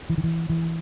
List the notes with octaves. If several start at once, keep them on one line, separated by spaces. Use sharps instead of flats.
E3
D#3
E3
E3